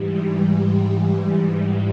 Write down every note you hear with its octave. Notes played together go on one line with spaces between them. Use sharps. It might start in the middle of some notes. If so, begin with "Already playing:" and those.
Already playing: G#2 E3 G3